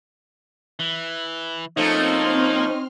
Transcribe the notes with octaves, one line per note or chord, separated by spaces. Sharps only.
E3
F3 A3 A#3 C4 C#4 D#4 C6 F6